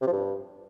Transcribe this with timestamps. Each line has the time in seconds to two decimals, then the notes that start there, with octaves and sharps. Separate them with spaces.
0.02 C3
0.07 F3
0.13 G2